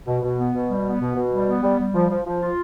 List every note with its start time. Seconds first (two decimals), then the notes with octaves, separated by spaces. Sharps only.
0.07 B2
0.22 B2
0.38 B3
0.54 B2
0.69 G3
0.84 B3
1.01 B2
1.16 B2
1.32 G3
1.48 B3
1.63 G3
1.79 G3
1.93 F3
2.10 F3
2.25 F3
2.41 F4